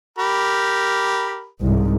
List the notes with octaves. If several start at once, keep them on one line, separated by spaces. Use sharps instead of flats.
G4 A#4 B5
C2 G#2